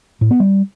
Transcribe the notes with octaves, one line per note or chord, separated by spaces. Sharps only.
A2
B3
G3